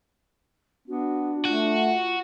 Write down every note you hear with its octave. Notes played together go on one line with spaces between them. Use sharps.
B3 D4 F#4
A3 F4 F#4